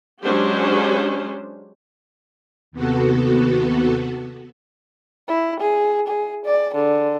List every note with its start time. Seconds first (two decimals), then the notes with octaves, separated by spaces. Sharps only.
0.21 F#3 G#3 C#4 D4 G4 C5
2.72 D#2 C3 B3 F#4 A4
5.28 E4
5.60 G#4
6.07 G#4
6.45 D5
6.75 D3